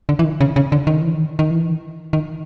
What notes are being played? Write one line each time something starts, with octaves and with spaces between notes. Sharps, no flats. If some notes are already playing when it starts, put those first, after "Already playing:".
D3
E3
D#3
C#3
C#3
D3
D#3
E3
D#3
D#3
E3
D#3